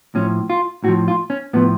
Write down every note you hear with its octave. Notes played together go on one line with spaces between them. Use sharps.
A2 F3 C#4
F4
A2 F3 F#4
F4
C#4
A2 F3 B3